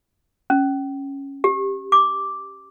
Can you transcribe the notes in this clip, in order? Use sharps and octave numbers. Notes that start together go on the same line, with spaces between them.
C#4
G4
D6